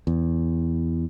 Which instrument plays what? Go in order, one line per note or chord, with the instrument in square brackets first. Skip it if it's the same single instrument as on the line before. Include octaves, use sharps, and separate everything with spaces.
[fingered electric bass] E2